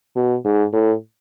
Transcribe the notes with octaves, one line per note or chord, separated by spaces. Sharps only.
B2
G#2
A2